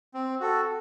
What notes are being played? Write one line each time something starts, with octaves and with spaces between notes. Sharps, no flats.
C4
F#4 A4